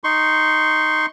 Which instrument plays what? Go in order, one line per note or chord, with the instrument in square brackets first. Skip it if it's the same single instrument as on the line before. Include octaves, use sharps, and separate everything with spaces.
[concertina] D#4 C6 C#6